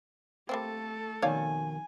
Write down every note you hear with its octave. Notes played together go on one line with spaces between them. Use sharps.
G3 A3 A#3 C4 A4
F2 B2 D#3 C#5 D5 F5 G#5